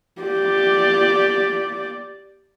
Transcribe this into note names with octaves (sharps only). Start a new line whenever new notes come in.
G4 D5